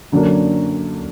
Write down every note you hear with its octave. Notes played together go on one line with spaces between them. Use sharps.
F#2 D3 F#3 A#3 D4